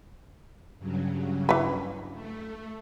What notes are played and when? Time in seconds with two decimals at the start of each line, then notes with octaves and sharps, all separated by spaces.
0.78 G2 C#3 F#3
1.49 E3 B4
2.11 A3